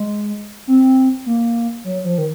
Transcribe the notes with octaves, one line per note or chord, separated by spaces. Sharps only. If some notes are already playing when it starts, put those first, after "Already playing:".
Already playing: G#3
C4
A#3
F#3
F3
D#3